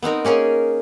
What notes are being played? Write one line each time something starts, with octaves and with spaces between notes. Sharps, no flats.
B3 C4 D#4 A#4
A#3 C#4 G#4 A#4